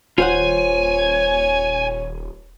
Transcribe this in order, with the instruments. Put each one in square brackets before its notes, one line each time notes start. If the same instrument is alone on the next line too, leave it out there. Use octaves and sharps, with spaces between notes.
[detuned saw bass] D#1 [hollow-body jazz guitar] F4 C5 F#5 [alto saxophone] C#5 [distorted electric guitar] G#5